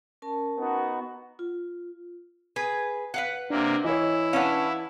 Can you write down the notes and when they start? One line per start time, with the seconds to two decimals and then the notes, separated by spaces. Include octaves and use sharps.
0.22 C#4 A#4 A5
0.58 B3 D#4 F#4
1.39 F4
2.56 G#4 B4
3.14 B4 F5 F#5
3.50 C3 A#3 D4
3.84 E3 E4 C#5 D#5
4.33 C#4 D4 B4 F5 F#5